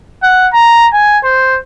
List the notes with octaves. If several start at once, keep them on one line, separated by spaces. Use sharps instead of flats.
F#5
A#5
G#5
C5